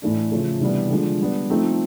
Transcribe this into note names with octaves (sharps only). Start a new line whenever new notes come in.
A2 E3 A3 D4
C#3 F3 A3
C3 E3 G3 B3 D4
D3 F3 G#3
G3 B3 D4
F3 A3 C4 D#4